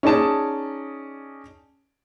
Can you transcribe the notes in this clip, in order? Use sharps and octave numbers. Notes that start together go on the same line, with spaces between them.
C#4 D#4 G#4 D5 A5